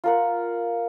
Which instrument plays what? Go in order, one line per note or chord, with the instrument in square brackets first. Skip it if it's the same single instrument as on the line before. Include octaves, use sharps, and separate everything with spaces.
[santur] F4 A#4 F#5